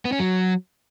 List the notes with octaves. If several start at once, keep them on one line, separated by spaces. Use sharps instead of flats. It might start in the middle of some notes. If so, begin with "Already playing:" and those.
B3
C#4
F#3